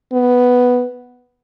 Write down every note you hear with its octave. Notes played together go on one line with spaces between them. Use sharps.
B3